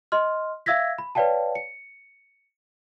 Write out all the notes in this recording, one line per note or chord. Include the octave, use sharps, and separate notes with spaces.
D#5 C6 F6
E5 F5 E6 G#6 A#6 B6
B5
B4 C#5 D5 F5 G5 A5
C#7